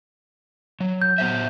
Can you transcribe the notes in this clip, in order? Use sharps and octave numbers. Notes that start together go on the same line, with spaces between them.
F#3
G6
B3 C5 E5